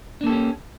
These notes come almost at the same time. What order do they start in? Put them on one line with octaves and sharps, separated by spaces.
D4 A#3 A4 G4 C#4